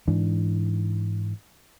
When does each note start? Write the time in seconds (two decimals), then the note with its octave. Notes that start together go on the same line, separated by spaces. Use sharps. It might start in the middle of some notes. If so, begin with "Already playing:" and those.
0.08 G#2 E3 D4